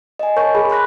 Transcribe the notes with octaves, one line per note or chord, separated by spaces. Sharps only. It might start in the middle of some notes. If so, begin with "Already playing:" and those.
D#5 G#5
A#4 C#5 G#5 A5 C#6 G6
G#4 B5
B5 C6 F#6 A#6